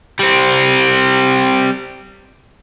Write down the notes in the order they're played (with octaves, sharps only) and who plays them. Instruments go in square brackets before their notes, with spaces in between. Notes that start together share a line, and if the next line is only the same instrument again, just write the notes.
[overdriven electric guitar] G3 C4